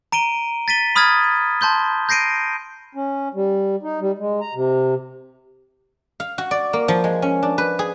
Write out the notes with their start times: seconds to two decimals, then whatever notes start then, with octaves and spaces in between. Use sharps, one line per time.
0.12 A#5 D7 D#7 G7
0.68 A6 B6 D#7 G7
0.96 B5 D#6 F6 G#6 A6
1.61 A5 C6 G6 G7
2.09 G6 A#6 C7 D7 D#7
2.95 C#4
3.34 G3
3.83 D#4
4.00 G3
4.18 G#3
4.41 A#5
4.54 C3
6.20 F5
6.38 F#4
6.51 D5
6.73 A#3
6.88 F3
7.04 G#3
7.22 C#4
7.43 D4
7.58 B4
7.79 G#4